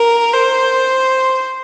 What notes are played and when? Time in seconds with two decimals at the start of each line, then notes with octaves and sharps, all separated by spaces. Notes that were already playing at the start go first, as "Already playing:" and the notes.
Already playing: A#4
0.34 C5